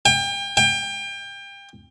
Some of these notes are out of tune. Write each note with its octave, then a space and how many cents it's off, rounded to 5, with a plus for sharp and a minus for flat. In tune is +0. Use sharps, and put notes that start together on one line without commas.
G5 +35
G5 +30